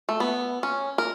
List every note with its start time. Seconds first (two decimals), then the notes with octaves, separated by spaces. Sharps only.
0.09 A3
0.20 B3
0.63 C#4
0.98 A#4